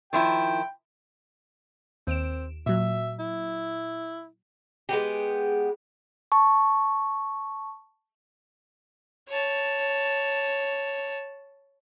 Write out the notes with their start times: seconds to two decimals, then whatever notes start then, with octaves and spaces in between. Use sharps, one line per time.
0.13 D#3 F3 E4 G5
2.07 D#2 C4 D7 E7
2.66 A#2 F#3 E5
3.19 E4
4.89 G#3 B3 G4
6.32 A5 C#6
9.29 C#5 A5